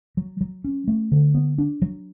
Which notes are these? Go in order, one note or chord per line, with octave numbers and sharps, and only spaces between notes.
F#3
F#3
C#4
A3
D3
B3
D4
F#3